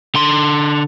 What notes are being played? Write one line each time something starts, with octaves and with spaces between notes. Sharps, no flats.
D3 C6